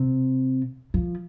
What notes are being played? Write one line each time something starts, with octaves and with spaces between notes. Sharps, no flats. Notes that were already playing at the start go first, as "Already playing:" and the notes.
Already playing: C3
F3